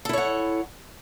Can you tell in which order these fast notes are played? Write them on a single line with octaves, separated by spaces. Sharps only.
A4 E4 C#5 F#5